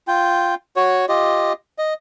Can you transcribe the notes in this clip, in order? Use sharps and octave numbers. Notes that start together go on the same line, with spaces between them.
F4 G5
F#4 C#5
F4 G4 D#5
D#5